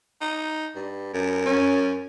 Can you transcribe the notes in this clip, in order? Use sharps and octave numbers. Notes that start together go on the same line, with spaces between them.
D#4
G2
F#2
C#4